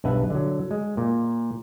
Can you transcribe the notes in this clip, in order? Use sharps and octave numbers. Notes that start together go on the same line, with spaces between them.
B1 G2 B4 E5 F#5
D3 F#3
G#3
A#2